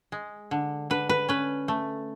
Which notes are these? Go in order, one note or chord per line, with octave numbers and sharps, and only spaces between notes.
G#3
D3
D3 B4
B4
C#4 B4
A3